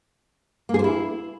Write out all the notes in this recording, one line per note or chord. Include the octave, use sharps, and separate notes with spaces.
A#3
G#4
C5
E4